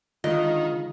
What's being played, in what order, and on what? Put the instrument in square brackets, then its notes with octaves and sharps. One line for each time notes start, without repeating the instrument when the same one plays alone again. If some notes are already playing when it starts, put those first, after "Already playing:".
[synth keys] D3 G#3 [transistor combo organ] D#3 [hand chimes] F4 [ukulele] D#5